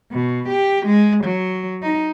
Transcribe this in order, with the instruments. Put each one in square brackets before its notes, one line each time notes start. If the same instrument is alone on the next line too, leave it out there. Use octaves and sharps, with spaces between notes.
[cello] B2
G4
G#3
F#3
D#4